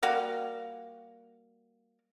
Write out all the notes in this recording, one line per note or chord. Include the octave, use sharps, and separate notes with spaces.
G3 A#3 F#4 F5